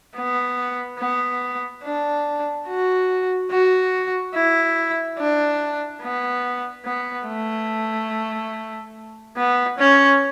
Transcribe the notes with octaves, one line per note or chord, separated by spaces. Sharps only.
B3
B3
D4
F#4
F#4
E4
D4
B3
B3
A3
B3
C#4